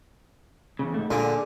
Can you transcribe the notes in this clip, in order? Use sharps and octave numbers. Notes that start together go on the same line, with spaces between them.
E2 C#3
G#2 A3
A#2 D3 D4 G#4